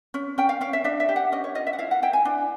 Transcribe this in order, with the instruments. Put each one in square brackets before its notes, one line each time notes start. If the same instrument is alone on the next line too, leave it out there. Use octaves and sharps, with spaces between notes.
[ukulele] C#4
C#4 G5
F5
C#4 F5
E5
D4 E5
E5
G4
F#5
C#4 D#5
C#5
F4 D#5
E5
F#5
E4 F5
F#5
E4 G5
G#5
D4